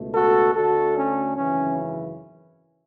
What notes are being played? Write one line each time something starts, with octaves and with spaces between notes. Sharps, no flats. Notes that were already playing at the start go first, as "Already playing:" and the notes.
Already playing: C#2 B2 A3
F#4 A4
D2 D3 A3 F#4 A4
C#4
G#1 F#2 C#3 E3 C#4